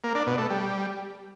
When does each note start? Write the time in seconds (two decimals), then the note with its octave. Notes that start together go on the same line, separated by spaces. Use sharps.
0.04 A#3
0.15 D4
0.27 B2
0.38 A3
0.50 G3